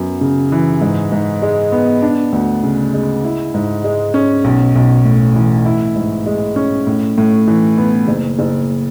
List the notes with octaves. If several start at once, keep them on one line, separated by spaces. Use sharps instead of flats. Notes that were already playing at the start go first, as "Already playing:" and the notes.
Already playing: F#2 B3
C#3
E3
G#2
G#2
G#3
B3
D4
D2
C#3
G#3
E4
G#2
G#3
C#4
B1
B1
A2
E3
E4
G#2
G#3
C#4
A2
A2
E3
B3
F#1
F#1